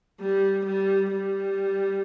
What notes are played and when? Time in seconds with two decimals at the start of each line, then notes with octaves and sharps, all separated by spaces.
0.20 G3
0.66 G3
1.12 G3